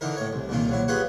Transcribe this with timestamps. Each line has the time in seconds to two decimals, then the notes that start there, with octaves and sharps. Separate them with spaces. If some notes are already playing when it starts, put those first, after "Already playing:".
0.01 D3 E3 D#4 A#4
0.17 A2 C#5
0.33 C2
0.49 C2 A#2 D#3 F4
0.69 A#1 F#3 E4
0.88 B3 F4 G4 G#4 C#5 F#5